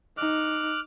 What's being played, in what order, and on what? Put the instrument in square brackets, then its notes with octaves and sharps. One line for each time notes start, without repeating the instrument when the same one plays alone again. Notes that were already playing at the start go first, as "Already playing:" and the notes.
[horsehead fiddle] D#4 [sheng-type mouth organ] D6 F6 F#6